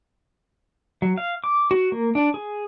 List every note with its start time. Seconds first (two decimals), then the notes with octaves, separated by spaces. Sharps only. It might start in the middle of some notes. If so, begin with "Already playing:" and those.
1.02 F#3
1.17 F5
1.44 D6
1.71 F#4
1.92 A#3
2.15 D4
2.34 G#4